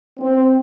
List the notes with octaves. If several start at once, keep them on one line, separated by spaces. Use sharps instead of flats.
C4